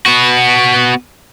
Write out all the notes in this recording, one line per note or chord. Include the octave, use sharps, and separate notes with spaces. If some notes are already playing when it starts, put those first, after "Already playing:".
B3 F#4